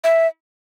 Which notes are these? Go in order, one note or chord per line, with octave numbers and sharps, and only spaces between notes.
E5